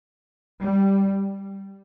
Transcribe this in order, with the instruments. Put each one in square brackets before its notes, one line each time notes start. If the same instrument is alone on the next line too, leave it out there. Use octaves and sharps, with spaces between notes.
[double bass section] G3